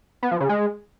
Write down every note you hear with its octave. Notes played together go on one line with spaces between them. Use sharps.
B3
F3
C#3
G#3